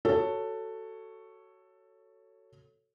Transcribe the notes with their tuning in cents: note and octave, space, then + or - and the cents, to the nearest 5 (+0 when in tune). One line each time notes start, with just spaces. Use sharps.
F#4 +15 A4 +10 C#5 +0